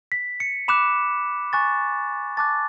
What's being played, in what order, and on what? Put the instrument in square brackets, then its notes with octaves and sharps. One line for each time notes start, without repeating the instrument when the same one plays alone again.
[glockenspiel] B6
C#7
B5 D6 F#6 E7
G#5 C#6 F#6 A6
A5 D6 F#6 A6